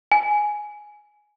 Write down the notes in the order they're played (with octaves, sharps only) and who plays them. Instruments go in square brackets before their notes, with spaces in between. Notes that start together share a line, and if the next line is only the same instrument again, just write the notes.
[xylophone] G#5